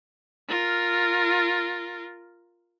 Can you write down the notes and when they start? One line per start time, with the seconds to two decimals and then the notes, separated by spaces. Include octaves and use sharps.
0.48 F4 A#4